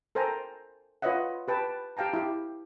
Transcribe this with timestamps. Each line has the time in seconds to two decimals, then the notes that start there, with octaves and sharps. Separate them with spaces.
0.15 A4 A#4 C5 G5 G#5 A#5
1.02 F4 B4 C#5 D#5 E5 F#5
1.48 G4 B4 G5 A5
1.97 G4 F5 G5 A5 A#5
2.13 E4 G4